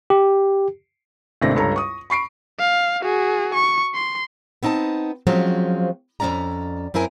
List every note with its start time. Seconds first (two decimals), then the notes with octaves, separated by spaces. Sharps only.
0.10 G4
1.41 G#1 C3 A3 D4 A#6
1.55 C#2 G2 A4 C#5 A#5
1.76 C#6 D#6
2.10 B5 C#6 C7 D7
2.59 F5
3.02 F#4 G#4
3.54 C#6
3.95 C6
4.63 B3 C4 D#4 G5 A5
5.27 F3 F#3 G#3 C4 C#4 F4
6.20 F2 F3 C#4 D5 A#5
6.94 F#2 C4 E4 A#4 G#5